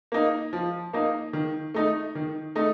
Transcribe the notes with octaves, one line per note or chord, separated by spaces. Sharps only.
A#3 D#4
F3
A#3 D#4
D#3
A3 D#4
D#3
A3 D#4